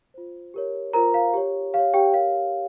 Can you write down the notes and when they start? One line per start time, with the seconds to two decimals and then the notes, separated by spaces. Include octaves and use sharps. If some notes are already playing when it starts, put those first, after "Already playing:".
0.14 F4 C5
0.54 G4 A#4 C#5
0.93 F4 A#4 C5 A#5
1.14 F5
1.34 G4 C#5
1.73 G4 F5
1.78 C#5
1.94 G4 G5
2.13 G4 A#4 C#5 F5